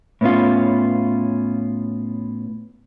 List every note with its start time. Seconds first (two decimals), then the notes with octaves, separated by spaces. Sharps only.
0.21 A2 B3 C#4 F4